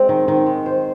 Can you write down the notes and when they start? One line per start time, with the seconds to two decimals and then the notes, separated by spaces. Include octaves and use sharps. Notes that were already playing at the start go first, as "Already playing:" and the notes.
Already playing: G#3 C4
0.09 D#3
0.28 D#3
0.46 G#3
0.66 C5